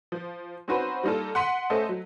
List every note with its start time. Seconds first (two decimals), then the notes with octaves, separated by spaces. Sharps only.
0.12 F3
0.68 C4 C#4 D#4 F#4 B4 C5
1.03 G3 A#3 D#4 F4 A4
1.35 F#5 C6 B6 D#7
1.70 A3 C#4 A4 C5 D#5
1.89 F#3